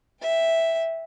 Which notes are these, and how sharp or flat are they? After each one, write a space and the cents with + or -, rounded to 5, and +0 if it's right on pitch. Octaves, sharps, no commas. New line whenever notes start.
E5 +0 G5 +10